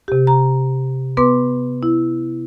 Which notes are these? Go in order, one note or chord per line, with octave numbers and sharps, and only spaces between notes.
C3 G4
A#5
B3 B4 C6 D6
E4